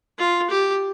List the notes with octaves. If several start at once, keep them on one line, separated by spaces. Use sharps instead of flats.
F4
G4